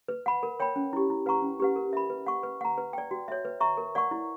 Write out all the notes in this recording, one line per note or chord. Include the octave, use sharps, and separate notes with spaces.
B4
F#5 B5
A#4
C#5 G5 B5
C#4
E4 G4
E4
B4 F#5 A#5 C#6
C#4
G4 B4 F#5
A#4
E5 B5
B4
F#5 C#6
B4
F#5 A#5
B4
D5 G5
F#4
C#5 E5
B4
E5 A#5 C#6
A#4
D5 F#5 C#6
E4